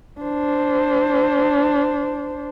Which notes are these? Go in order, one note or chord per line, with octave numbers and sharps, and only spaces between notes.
D4 C5